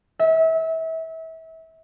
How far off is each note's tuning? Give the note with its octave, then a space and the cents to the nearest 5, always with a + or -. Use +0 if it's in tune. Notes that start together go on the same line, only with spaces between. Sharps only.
E5 -30